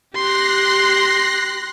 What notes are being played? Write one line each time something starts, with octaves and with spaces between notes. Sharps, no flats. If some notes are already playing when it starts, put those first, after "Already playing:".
G4 C6 F#6 A#6 C7